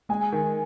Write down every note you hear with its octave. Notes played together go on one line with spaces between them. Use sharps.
G#3 G#5
D#3